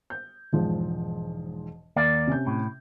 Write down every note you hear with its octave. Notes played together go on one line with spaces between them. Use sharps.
G6
E1 G#2 F3
D#2 A#3 D5
C3 C#4 G6
A2